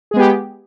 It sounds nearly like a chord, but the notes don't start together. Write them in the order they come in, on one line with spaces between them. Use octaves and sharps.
G#4 G#3 B3 G4